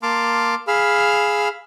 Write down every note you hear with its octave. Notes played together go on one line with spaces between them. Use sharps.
A#3 A5 C6 D6 F6
G#4 F5 B5 E6 F6